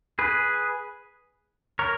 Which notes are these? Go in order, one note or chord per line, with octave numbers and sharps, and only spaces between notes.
G#4 B4
A#4 C#5